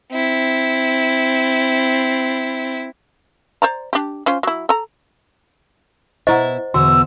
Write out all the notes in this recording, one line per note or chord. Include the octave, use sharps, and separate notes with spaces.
C4 E4
C5 D5 A#5
D4 G4
C#4 F4 C5
F#3 E4
A4 A#5
B2 E4 C5 D#5 E5 F#5 A#5 C#6
E2 B2 D3 F#4 C6 E6